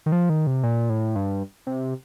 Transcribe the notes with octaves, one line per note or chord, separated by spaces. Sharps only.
D#3
F3
D#3
C3
A#2
A2
G2
C3